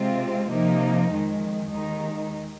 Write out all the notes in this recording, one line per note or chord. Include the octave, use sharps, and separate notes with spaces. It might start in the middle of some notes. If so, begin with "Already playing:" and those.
Already playing: C3 G#3 C4 F4
C3 F3 A#3 D#4
F2 D#3 G#3
D#2 D#3 G#3 D#4